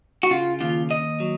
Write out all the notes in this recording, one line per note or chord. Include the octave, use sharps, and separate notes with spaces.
F#4
C#3 F4
D#2 F4
D#2 D#5
F#3